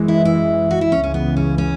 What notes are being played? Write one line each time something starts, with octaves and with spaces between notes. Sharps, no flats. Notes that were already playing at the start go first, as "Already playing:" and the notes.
Already playing: F#2 E3 G#3
E4
E4
F#4
E4
C#2 C#3 E3 C#4
C#4
B3
C#4
C#4